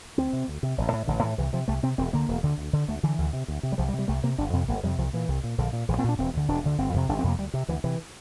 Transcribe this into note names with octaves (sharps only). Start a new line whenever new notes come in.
D2 C4
C3
D2
C3
A1
A2
A1 D3
A2 E3
C2 E3
C3 F3
C2 A3
C3 C4
E1 C4
D2 D3 A#3
E1
D2 D3
D2
D3
D2 A3
D3 E3
D2
C3
D2
C3
G3
C2 F3
G3
C3
G3
C2 A3
C3 A#3
G1 D4
F2 C3 C4
G1 A#3
F2 C3 G3
C2 F3
A#2 E3
C2
A#2
A#1 D3
A#2
A#1 E3
C4
A#2 D4
E1 C4
D2 D3
E1 D4
D2 D3
G1 C4
F2 C3
G1 D4
C4
F2 C3 A#3
D2 G3
C3
D2 E3
C3 E3